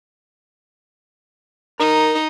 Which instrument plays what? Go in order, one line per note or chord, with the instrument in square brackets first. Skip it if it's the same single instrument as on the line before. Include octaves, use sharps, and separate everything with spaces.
[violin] D#4 [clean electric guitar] A#4